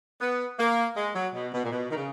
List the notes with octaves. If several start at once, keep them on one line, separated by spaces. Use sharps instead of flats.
B3
A#3
G#3
F#3
B2
B2
A#2
B2
D#3
C#3